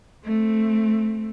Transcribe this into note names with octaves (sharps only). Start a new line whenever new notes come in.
A3 C4